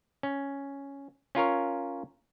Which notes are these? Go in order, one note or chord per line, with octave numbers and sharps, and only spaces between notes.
C#4
C#4 F4 A#4 C#5